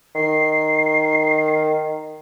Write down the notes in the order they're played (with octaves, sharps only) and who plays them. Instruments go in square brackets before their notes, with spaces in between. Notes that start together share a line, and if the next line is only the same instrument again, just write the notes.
[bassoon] D#3 [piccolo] C7